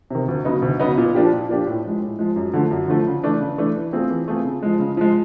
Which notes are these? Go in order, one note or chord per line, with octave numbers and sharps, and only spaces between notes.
C3 D#3
D2
C#3 F#3 B3 D#4
D2
C#3 F#3 B3 D#4
A#2
F3 A#3 D4 G4
A#2
F3 A#3 D4 G4
A2
F3 G#3
A2
F3 G#3
F#2
D3 F3 A3
F#2
D3 F3 A3
C#3
E3 A3 D4
C#3
E3 A3 D4
E3
A3 C4 F4 G#4
E3
A3 C4 F4 G#4
C#3
F3 G#3
C#3
F3 G#3